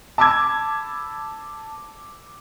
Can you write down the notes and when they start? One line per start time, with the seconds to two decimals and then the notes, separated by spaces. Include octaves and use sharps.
0.18 A5 B5 D6 E6 G#6